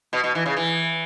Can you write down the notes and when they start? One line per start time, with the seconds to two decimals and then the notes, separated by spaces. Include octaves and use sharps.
0.13 B2
0.24 B2
0.35 E3
0.46 C#3
0.57 E3